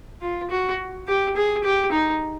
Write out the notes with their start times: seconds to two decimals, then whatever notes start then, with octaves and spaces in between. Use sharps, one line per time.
0.22 F4
0.51 F#4
1.08 G4
1.36 G#4
1.64 G4
1.92 D#4